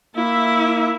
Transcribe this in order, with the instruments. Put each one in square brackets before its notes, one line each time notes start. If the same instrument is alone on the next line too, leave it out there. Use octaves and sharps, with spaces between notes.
[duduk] A#3 [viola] E4 E5